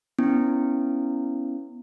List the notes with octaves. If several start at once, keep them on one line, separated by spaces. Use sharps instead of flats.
B3 C#4 E4